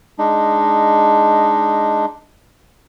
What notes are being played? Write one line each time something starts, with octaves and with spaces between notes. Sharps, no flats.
G#3 D4 D#4